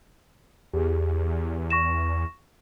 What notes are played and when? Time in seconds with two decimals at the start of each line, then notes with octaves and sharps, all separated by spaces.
0.73 E2 G4 G#4
1.70 C#6 A#6 E7